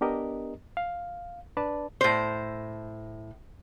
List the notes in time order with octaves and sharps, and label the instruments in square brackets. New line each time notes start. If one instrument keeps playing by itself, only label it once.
[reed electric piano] B3 D4 G4 A#4 D#5
F5
D4 B4 D5 A5
[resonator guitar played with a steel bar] A2 C5